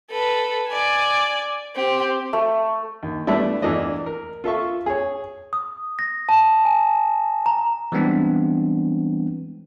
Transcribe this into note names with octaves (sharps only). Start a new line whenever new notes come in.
A4 B4
D5 G#5
C4 G4
A3
D#2
G3 A3 B3 D4 E4
E2 E3 A3 D4 D#5
A#4
F4 A4 E5 C#6
G#4 C#5
D#6
A#6
A5
G#5
A#5
E3 G3 G#3 B3 C4 D4